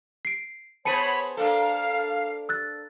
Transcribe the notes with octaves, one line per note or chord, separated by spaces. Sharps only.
C7 D7
B3 G#4 C5 C#5 A5 B5 C#7 D#7
A#3 D4 A4 F5
E6 F#6 A6